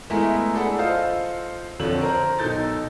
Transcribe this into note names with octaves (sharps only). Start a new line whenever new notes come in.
G#3 A3 B3 E4 G#4 A#4
D4 G#4 A4 F#5 B5
F4 A4 C5 D#5 F5
F2 D3 F3 C#5 F#7
A#4 C5 A#5
B1 D#4 A4 G6 A6